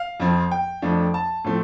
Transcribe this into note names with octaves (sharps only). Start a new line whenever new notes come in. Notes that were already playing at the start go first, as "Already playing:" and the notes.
Already playing: F5
F2 F3 C4
G5
F2 F3 A3 D4
A5
A2 F3 A3 C4